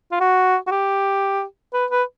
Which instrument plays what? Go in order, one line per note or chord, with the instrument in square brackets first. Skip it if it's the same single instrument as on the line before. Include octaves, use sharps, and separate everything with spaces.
[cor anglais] F4
F#4
F#4
G4
B4
B4